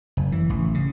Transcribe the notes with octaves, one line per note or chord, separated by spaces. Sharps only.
F#1
E3
A1
C#3